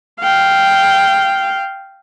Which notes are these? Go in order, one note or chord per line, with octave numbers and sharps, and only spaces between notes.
F5 G5